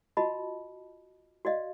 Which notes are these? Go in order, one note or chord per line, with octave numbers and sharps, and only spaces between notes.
F4 F#4 D#5 A5 B5
F#4 D5 D#5 F5